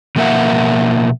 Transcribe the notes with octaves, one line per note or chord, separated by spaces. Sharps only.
B2 F3 A#3 A#4 E5 F#5